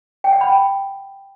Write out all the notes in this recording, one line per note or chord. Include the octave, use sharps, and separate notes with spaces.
G5
F#5
B5
G5